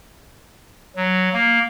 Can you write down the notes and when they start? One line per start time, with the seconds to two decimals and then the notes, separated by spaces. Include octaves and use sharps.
0.96 F#3
1.33 A#3